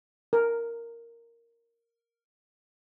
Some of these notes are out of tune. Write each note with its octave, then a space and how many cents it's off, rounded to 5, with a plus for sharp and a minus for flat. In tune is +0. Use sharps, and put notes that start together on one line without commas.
A#4 -5